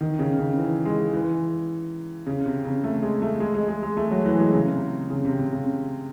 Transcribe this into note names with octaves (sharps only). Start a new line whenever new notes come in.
D#3
C#3
C#3
E3
G#3
E3
C#3
C3
C#3
A3
G#3
A3
G#3
G#3
G#3
G#3
A3
F#3
E3
G#3
C#3
C3
C#3
C3
C3
C#3